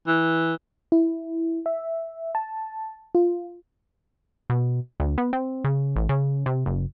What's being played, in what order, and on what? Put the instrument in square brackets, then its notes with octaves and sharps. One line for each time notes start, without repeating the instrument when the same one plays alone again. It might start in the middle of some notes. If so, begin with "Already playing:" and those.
[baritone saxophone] E3
[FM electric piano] E4
E5
A5
F4
[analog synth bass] B2
D2
B3
C4
C#3
A1
C#3
C3
F#1